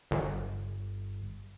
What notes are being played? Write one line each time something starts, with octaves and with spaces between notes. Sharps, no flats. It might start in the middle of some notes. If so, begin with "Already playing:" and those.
G1